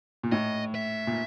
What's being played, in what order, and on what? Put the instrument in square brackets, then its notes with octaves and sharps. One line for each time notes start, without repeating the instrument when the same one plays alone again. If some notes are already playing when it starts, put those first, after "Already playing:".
[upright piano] A#2
[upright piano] A2 [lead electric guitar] D#5
[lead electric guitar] E5
[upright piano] A#2